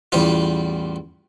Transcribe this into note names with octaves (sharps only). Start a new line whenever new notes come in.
A1 E2 G3 F4